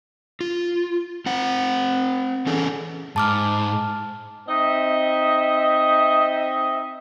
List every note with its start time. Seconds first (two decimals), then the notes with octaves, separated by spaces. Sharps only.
0.41 F4
1.26 C4 C5 F#5
2.46 E3 C#4 G#4 A4
3.16 G#2 A5 D6 F6
4.48 C4 D#4 D#5 E5